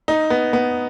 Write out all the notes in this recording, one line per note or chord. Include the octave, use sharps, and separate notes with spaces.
D#4
B3
B3